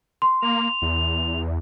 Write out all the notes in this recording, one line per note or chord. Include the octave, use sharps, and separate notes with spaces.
C6
A#3 F7
E2